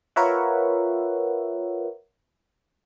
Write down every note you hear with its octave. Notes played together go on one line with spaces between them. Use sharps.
F4 A#4 B4 C#5 E5 F#5